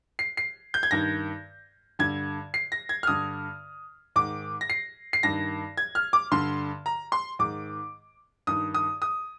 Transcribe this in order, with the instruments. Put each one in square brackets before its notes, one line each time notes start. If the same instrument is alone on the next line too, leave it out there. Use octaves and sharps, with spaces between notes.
[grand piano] C7
C7
G6
G#6
G2 D#3 A#6
G2 D3 G#6
C7
A#6
G#6
F6
G2 D3 D#6
G#2 D#3 D6
A#6
C7
C7
G2 D#3 A#6
G#6
F6
D6
G2 D3 C6
A#5
C6
G#2 D#3 D6
G2 D#3 D#6
D#6
D#6